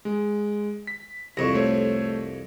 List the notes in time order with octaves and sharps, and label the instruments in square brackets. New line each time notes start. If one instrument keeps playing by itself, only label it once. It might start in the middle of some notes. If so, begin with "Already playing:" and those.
[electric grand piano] G#3
B6
[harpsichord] C2 F2 [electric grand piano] C#6 A#6
[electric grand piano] A3 C5 C#5